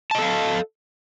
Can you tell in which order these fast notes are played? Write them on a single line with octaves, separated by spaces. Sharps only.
A5 D#5 A4 F5